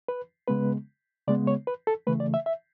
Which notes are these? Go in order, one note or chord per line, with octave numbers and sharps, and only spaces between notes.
B4
C#3 G#3 B3 B4
C#3 G#3 B3 D5
C#5
B4
A4
C#3 E3 A3 B4
D5
E5
E5